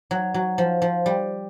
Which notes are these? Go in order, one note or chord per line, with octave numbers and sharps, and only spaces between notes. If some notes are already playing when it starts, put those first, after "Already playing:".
F#3
F#3
F3
F3
G3